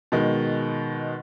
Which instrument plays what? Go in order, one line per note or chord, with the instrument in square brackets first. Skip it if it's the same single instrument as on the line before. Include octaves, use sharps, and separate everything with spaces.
[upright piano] B2 D#3 G#3